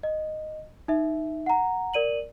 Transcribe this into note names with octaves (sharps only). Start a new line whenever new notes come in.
D#5
D#4 E5
F#5 A#5
A#4 D5 D#7 F#7